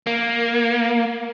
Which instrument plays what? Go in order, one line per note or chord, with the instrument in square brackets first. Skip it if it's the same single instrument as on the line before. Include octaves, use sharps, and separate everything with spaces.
[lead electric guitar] A#3